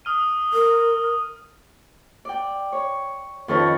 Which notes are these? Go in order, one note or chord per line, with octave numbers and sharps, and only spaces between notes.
D#6 F6 D#7
A#4
D5 G5
C#5
F2 D#3 C#4 A4 B4 C#5